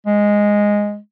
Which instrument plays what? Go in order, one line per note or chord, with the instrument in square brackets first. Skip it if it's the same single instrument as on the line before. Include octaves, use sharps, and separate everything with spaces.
[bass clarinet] G#3